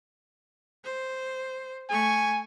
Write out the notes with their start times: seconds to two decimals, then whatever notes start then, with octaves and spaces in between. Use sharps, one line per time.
0.84 C5
1.90 A3 G#5 C#6